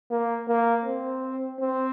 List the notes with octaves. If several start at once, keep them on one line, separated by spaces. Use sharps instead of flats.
A#3
A#3
C4
C4